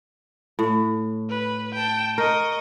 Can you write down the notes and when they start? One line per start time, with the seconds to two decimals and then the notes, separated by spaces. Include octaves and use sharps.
0.59 A2
1.30 B4
1.75 G5 A5
2.18 A#4 D#5 C#6